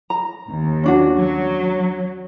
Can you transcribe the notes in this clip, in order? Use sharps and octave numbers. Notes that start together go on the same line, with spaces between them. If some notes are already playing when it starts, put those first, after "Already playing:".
A#5
D#2
C#4 D4 F#4
F#3